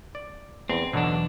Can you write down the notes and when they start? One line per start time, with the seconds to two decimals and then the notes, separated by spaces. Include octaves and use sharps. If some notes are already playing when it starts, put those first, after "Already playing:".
0.15 D5
0.70 E2 C4
0.93 B1 E2 B2 D3 F#3 D4